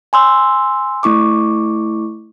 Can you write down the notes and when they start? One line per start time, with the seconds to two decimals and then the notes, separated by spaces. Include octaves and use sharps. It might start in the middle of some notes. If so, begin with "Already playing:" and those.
0.13 G#5 C6 E6
1.03 A3 E4 C#6 D6